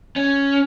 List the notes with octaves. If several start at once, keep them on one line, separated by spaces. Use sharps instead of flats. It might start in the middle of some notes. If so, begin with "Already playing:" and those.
C#4